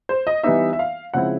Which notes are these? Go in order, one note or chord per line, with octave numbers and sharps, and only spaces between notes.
C5
D#5
E3 G3 B3 D#4 E5
E5
F5
C#3 F3 G#3 C4 E4 F#5